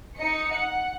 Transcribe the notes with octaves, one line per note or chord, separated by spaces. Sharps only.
D#4 D#5 C#7
F#5